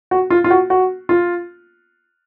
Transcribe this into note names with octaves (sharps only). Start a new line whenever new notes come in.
F#4
F4
F4
F#4
F#4
F4